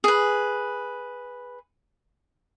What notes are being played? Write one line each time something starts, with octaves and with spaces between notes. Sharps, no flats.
G#4 B4